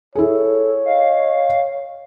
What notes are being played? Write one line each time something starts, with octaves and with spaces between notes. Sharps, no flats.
E4 G#4 A4 C#5
D#5 F5